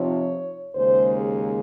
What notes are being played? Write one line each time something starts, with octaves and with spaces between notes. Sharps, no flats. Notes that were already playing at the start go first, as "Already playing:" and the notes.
Already playing: C3 F3 C4 D#4 C#5
D#2 C#3 G#3 C5
G#4